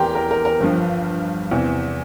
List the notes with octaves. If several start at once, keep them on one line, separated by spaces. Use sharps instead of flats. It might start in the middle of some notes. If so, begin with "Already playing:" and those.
Already playing: E2 E3 G4 A#4 G5 A#5 C6
A#4
A#4
A#4
G1 G2 F3
E2 C3 E3